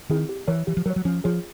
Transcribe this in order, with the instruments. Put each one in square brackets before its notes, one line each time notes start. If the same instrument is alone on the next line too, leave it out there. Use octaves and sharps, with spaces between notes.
[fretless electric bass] D#3 [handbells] C4 E4 G#4
[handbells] G4
[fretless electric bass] E3 [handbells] A#4 C#5
[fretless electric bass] E3 [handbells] G4
[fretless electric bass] F3
[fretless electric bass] F#3 [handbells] A#4
[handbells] C#5
[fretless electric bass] F#3
[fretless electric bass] F3 [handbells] C#4
[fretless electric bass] F3 [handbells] F4 G#4 C#5